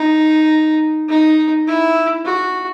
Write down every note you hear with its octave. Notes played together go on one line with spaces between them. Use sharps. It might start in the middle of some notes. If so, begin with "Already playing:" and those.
Already playing: D#4
D#4
E4
F#4